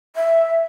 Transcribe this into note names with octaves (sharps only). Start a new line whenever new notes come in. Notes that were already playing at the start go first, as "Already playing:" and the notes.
E5